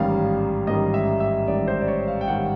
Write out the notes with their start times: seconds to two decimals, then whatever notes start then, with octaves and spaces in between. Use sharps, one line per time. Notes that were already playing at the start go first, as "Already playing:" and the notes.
Already playing: A1 G#2 D#3 G3 F5
0.67 A1 G#2 D#3 G3 D#5
0.94 E5
1.20 E5
1.47 A1 G#2 D#3 G3 D5
1.68 C5
1.81 D5
1.88 C#5
2.08 F5
2.21 G5
2.28 G#2 D#3 G3 F#5